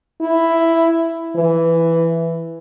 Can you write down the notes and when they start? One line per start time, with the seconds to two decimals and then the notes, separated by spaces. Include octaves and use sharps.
0.21 E4
1.36 E3